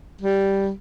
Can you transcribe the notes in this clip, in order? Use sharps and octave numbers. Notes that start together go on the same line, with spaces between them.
G3